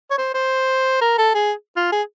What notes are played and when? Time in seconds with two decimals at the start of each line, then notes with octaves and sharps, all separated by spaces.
0.11 C#5
0.18 C5
0.34 C5
1.01 A#4
1.18 A4
1.34 G#4
1.76 F4
1.92 G#4